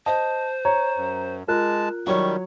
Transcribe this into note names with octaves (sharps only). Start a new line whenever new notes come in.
C5 D#5 A5
C#5 A#5
F#2
G#3 F4 A#4 A5 F#6
D#3 F#3 G3 C#5 C#6